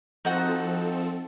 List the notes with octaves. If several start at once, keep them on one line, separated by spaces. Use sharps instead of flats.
F3 C4 D#4 F#4 A4 F#5